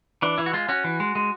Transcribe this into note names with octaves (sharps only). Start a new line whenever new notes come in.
E3 D4
E3 E4
F#4
G#3 F4
C#4 F#4
E3
G#3
G#3